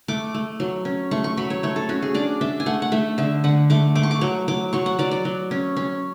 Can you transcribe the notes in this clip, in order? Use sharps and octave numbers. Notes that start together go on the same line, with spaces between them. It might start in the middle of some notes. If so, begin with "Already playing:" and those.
A3 D6
A3
F#3
C#4
A3 C#6
C#6
F#3 B5
C#5
A3 C#5
A4
C#4 F#4
G#4
D4 D5
D4 E5
G#5
A3 F#5
F#5
A3 E5
D3 E5
D3 F#5
A3 D6
A3 D6
C#6
D6
F#3 C#6
F#3 D6
F#3 C#6
F#5
F#3 D5
D5
F#3
C#4
C#4